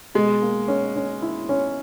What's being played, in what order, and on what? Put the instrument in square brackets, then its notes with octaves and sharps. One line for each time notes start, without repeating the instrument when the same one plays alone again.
[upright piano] B2 [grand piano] G#3
[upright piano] A#3
C#4
C#4
E4
C#4